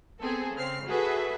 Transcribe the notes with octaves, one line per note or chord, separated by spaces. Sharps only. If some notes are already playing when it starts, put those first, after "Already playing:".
B3 C4 G#4 A4
C#3 C4 F6 C7
F#4 G#4 A4 B4 E5